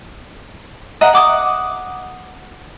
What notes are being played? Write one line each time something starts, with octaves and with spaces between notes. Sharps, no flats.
D#5 E5 F#5 A#5
F#5 D6 D#6